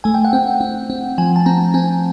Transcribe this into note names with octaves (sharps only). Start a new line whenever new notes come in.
A3 G#5
G5
F#5
C4 G5
C4
C4
F3 G#5
A5
C4 A#5
C4 G#5